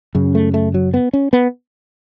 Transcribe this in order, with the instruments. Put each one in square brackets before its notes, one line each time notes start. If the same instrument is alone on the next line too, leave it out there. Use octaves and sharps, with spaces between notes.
[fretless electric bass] F#2 C#3
A3
A3
F#3
B3
C#4
B3